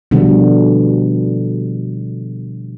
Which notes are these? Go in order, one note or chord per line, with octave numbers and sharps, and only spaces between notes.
B2 D3 F3 G3